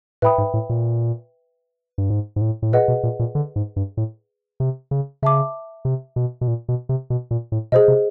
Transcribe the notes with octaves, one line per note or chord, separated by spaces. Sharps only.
A2 B4 E5 G5 B5 D#6
G#2
A2
A#2
G2
G#2
G#2
A2
A2
A#2 G#4 B4 D#5 F#5
B2
A#2
A#2
D3
G#2
G2
A2
C3
C#3
C#3 E5 A5 D6
C3
B2
B2
A#2
B2
C3
B2
A#2
A2
B2 G#4 C5 D#5
C3